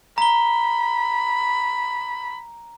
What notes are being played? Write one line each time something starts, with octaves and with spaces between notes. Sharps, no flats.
A#5 B5 G7